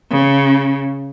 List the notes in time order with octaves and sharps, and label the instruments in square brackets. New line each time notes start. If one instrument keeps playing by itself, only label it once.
[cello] C#3